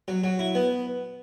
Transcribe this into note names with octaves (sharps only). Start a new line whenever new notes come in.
F#3
F#3
E4
B3